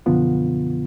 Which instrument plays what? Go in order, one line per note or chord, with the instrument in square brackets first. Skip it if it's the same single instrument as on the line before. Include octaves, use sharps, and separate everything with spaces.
[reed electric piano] F#2 B2 D3 F3 B3 F4